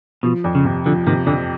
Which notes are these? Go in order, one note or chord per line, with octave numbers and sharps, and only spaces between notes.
B2 F3
F2
C#3
C3
D3 F3
C3 D#3
F2 D3